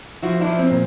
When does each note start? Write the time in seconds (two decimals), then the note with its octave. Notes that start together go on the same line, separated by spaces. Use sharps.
0.23 F3 E4 F#4
0.41 D4 E4
0.47 F3
0.59 C4
0.71 A#2